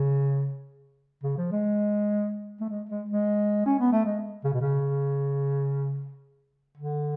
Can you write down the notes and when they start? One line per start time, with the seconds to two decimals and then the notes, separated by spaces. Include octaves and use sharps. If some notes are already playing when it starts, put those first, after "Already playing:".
Already playing: C#3
1.23 C#3
1.38 F3
1.52 G#3
2.61 A3
2.69 G#3
2.89 G#3
3.09 G#3
3.66 C#4
3.79 B3
3.92 A3
4.05 G#3
4.44 C#3
4.53 B2
4.61 C#3
6.77 D3